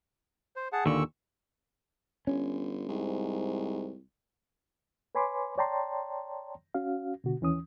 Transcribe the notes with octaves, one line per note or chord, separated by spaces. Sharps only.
C5
G#4 F#5 A5
D#2 A#2 D3 C#6 E6
G1 C#4
C2 G#2
B4 C#5 G#5 B5 C6 D6
C#5 D5 G5 A5 A#5 C6
C#4 F#4 F5
B2 D3 F#4
D#2 E3 C#4 D#6